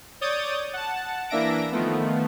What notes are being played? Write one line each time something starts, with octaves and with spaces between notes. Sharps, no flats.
C#5 D5 D#6 G6 A6
F#5 A5
E3 A#3 D4 E5 A#6 D7
D#3 F3 A3 B3